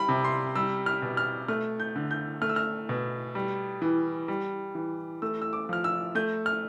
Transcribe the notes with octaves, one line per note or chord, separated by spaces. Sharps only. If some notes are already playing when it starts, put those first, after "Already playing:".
Already playing: G3 B5
C3
C6
G3 E6
F6
B2
F6
A3 F6
G6
D3
G6
A3 F6
E6
F6
B2
G3
E3
G3
E3
A3 E6
E6
D6
F3 F6
E6
A3 G6
F6